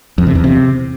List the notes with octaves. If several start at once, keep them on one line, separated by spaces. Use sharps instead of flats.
F2
C3
E2
C3